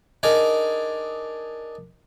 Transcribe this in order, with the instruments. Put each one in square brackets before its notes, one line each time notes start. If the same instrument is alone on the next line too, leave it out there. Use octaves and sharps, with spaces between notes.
[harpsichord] D4 D#4 G#4 A#4